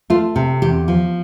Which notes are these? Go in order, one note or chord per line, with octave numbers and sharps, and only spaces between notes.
A3 F4
C3
E2 G4
F3